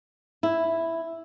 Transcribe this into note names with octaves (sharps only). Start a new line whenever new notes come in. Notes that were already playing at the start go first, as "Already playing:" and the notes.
E4